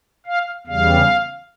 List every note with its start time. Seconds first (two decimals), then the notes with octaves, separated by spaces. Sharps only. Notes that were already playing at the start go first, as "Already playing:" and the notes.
0.26 F5
0.67 E2 C#3 G3 F5